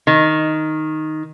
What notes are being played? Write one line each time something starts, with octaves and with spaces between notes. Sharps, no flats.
D#3